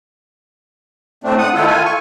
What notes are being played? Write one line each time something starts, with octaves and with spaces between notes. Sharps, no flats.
A2 A3 C4 D4
F#5 D#6
D#3 A3 E4 F4 A4
F4 G#5
C#6